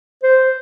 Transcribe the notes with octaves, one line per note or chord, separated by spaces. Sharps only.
C5